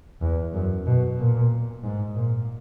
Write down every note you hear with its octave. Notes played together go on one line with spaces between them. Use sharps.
E2
F#2
B2
A#2
G#2
A#2